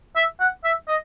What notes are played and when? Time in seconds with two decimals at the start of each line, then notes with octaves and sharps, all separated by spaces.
0.16 E5
0.40 F#5
0.64 E5
0.88 D#5